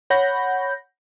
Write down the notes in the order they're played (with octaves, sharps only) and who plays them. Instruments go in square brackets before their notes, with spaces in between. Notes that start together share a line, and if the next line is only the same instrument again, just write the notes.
[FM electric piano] C#5 F#5 B5 G6 A#6